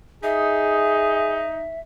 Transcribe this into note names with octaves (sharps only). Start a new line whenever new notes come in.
D#4 G#4 E5